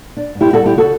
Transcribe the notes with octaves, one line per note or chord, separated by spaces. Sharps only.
D4
G2
E4 G4
G3 F#4 A4
E4 G4
C#3
F#4 A4